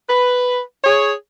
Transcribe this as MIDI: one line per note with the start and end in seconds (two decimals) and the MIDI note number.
0.09 0.60 71
0.84 1.11 68
0.84 1.11 73